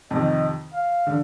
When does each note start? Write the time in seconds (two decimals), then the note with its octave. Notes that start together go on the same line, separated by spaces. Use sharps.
0.11 F2 C3 D#3 D#5
0.73 F5
1.07 D3